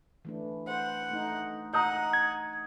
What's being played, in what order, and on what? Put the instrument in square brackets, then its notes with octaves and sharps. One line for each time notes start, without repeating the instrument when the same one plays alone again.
[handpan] E3 A3 D4
[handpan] C5 [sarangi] F#5
[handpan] A3 D#4
[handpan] D#5 [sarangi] F#5 [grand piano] A#5 D#6 G6
[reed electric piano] G#6